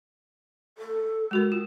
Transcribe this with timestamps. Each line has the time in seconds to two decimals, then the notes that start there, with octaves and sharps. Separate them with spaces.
0.78 A4
1.31 G#3 F#4 A#4
1.52 F4